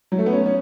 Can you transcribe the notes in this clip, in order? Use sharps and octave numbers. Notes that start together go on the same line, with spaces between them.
F#3
A3
B3
C#4
C#4